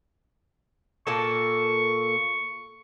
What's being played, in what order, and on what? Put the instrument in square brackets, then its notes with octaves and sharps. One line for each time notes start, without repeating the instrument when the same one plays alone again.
[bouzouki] A#2 A#3 A4 [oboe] C#6